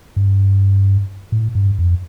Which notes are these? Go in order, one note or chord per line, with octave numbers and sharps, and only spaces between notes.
G2
A2
G2
F2